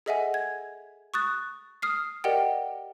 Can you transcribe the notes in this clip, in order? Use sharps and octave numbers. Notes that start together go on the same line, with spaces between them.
G#4 A4 D#5 E5 F#5 G#5
G#6
C#6 D#6 F#6 A6
D#6 F6 C7
G4 A#4 D5 D#5 F#5 G5